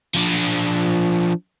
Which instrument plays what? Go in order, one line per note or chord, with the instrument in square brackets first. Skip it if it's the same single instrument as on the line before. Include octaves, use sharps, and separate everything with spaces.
[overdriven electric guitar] F3 D4